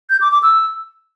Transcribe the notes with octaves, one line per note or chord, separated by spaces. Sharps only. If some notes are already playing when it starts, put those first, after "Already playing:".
G6
D6
D6
E6